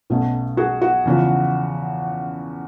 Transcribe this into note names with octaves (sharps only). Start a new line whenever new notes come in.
B1 B2 F#3 A3 C#4
F#4 G#4
F#4
E2 C#3 F3